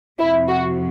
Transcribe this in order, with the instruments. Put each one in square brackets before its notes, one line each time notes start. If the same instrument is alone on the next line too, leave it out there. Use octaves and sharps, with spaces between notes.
[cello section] F2 C3 F3 [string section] E4
[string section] F#4